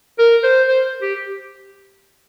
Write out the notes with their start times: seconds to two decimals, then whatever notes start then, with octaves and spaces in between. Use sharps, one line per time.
0.19 A#4
0.44 C5
0.68 C5
1.02 G4